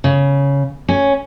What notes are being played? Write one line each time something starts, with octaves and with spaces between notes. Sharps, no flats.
C#3
C#4